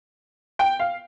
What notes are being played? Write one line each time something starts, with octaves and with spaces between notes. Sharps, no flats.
G5
F5